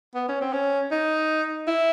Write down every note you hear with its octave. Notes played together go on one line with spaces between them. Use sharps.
B3
C#4
C4
C#4
D#4
E4